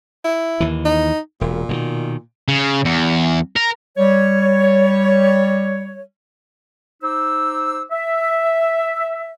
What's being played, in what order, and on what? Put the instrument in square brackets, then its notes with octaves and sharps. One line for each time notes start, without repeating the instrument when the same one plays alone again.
[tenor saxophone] E4
[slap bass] D#2 E3
[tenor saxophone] D#4
[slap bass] E1 [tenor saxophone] A#2
[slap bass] B2 D3 D#3
[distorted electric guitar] C#3
E2
A#4
[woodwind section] G3 C#5
D#4 C5 D6 E6
E5